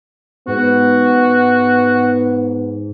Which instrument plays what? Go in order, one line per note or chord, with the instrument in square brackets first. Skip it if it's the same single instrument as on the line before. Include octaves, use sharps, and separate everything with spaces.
[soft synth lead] G#2 [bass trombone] B3 [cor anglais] F#4